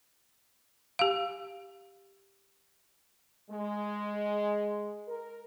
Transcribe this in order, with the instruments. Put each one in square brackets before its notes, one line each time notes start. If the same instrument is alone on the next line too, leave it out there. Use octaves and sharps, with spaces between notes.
[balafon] G4 F5
[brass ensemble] G#3
A#4